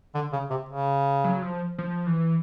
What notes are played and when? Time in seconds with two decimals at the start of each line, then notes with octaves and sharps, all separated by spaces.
0.14 D3
0.32 C#3
0.50 C3
0.69 C#3
1.24 F#3
1.42 F3
1.78 F3
2.07 E3